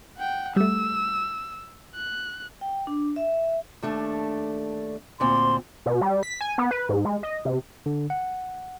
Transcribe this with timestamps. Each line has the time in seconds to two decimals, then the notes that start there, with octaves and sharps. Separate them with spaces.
0.17 F#5 G5
0.56 G3 A3 E6
1.95 F#6
2.61 G5
2.87 D4
3.16 E5
3.82 D#2 A3 D4
5.20 D2 A#2 C4 C6
5.86 B2
6.01 G3
6.23 B6
6.41 G#5
6.58 B3
6.71 B4
6.89 G#2
7.05 G#3
7.23 D#5
7.45 C3
7.86 D3
8.10 F#5